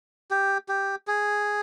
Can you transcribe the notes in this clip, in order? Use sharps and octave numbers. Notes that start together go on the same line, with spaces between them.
G4
G4
G#4